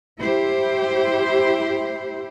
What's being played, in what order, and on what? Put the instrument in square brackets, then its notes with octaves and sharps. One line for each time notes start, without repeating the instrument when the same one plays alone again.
[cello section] E4 G4 C5